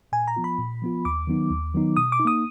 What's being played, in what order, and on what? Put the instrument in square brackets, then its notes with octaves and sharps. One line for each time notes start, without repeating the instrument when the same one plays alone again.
[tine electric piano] A#2 [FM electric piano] G#5
[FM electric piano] A#5
[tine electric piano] F3 B3 F4
[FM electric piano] B5
[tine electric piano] A#2
F3 B3 F4
[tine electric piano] D#2 [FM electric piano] D6
[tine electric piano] D#3 F#3 B3 D#4
D#2
D#3 F#3 B3 D#4
[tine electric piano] B2 [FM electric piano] D#6
[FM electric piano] D6
[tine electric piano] D#4
[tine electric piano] A#3 [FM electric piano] D#6